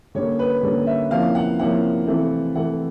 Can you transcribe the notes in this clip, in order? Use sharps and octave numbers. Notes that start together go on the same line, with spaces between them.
D3 G3 A#3 C#4 C#5
B4
D3 G3 A#3 C#4
E5
C3 F3 A#3 C#4 E4 F5
F#5
C3 F3 A#3 C#4 E4 F#5
C3 E3 A3 C4
C3 E3 A3 C4 F#5